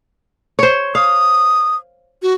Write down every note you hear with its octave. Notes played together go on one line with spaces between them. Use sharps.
C5 C#5
F5 D#6
F#4